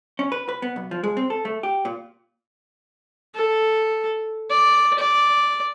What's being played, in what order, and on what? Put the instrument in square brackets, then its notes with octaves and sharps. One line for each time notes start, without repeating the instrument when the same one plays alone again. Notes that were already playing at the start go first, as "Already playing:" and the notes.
[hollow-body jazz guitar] C#4
B4
B4
B3
B1
F3
G#3
C4
A4
A3
G4
A#2
[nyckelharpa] A4
D5
D5